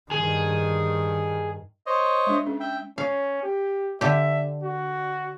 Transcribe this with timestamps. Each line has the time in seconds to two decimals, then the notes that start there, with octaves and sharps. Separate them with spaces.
0.11 G2 D#3 G#4
1.86 C5 C#5 D#5
2.27 G#3 D4
2.47 C#4
2.60 E5 G5
2.98 C#4 F5
3.43 G4
4.01 D3 G4 E5
4.63 F#4